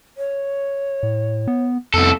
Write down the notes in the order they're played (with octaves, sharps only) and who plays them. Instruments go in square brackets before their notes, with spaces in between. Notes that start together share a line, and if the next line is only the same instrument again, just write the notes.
[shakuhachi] C#5
[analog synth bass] A2
B3
[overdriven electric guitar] C2 A4 [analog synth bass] F2 [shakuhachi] B3